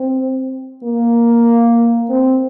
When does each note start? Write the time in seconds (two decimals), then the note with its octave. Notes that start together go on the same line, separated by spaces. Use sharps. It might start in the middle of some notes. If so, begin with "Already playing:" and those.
Already playing: C4
0.84 A#3
2.09 C4